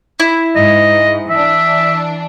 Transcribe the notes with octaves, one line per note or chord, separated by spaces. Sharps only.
E4
G#2 D#5
E3 D4 E5